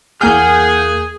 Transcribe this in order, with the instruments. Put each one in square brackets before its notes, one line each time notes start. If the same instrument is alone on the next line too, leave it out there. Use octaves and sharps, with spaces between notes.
[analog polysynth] E2 A#3 G6 [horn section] G#4 [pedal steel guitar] F#5 G#5 F6